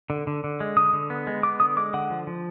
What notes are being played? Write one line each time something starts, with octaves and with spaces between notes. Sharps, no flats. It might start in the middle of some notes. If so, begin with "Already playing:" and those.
D3
D3
D3
G#3
D3 D#6
D3
B3
G#3
B3 D6
D3 D#6
G#3 D6
D3 F#5
F3
F3